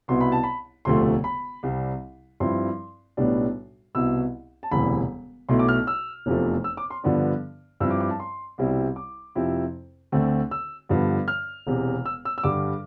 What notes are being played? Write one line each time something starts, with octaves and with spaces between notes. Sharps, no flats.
C2 B2 B3 E4 C6
B5
A5
B5
E1 D2 C3 F3 A3 C6
B5
C2 C3 G3
G2 F3 C4 E4 C6
B1 A2 G3 B3 D4
C2 B2 B3 E4 E6
A5
E1 D2 C3 E3 G3 B5
B1 B2 A3 E4 C6
D6
F6
E6
F1 E2 C3 F3 A3
E6
D6
C6
G2 D3 F3 B3 D4
G2 F3 C4 E4 E6
D6
D6
A5
C6
C2 B2 G3 C4 E4
D6
F2 C3 F3 C4 E4
D2 D3 A3 C4
E6
G2 D3 F3 B3
F6
E1 E2 C3
E6
E6
E6
G2 D3 G3 D6